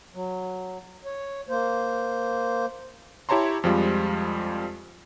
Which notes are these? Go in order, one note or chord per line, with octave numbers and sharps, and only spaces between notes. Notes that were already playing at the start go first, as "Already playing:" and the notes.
F#3
C#5
A#3 C5
E4 G4 C#5 A5 A#5 C6
F2 F3 G3 G#3 F4